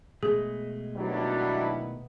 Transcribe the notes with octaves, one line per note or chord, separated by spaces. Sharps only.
B2 G#3 A3 G#4
D#3 F#3 G3 B3 D4 E4